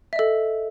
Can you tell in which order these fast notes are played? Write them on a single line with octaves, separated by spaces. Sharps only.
E5 D#5 A4